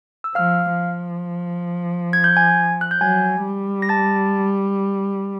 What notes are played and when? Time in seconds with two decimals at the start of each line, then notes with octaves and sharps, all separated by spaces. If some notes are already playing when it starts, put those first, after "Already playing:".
0.24 E6
0.35 F3 F5 F6
0.80 F3
2.13 G#6
2.24 G6
2.37 G#5 G#6
2.81 F#6
2.91 G6
3.01 F#3 G#5 G#6
3.45 G3
3.82 A#6
3.89 A5 A6